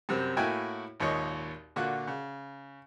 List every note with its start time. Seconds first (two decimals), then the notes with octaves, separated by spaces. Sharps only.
0.09 F#2 C3 G3 C4
0.37 A2 A#3 E4 F#4 G5 G#5
1.00 G#1 D#2 A#2 C#5 D#5
1.76 A#2 D3 F4 F#4 F#6
2.07 C#3